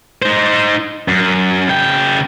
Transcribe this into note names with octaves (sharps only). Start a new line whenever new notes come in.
D#4 C5
F#2
C#3 G5